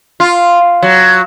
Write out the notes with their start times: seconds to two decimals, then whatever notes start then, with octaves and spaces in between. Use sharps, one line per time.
0.20 F4
0.83 F#3